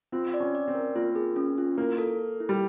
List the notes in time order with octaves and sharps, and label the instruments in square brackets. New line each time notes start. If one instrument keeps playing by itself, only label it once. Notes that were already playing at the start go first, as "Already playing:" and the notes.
[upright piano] C4 [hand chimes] F4
[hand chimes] D5
[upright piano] C#4
[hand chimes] D5
[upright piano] C4
[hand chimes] A#4
[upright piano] A#3 [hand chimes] F4
[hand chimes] G#4
C#4
F4
[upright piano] A#3 [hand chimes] E4
[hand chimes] A4
A4
E4
[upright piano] G3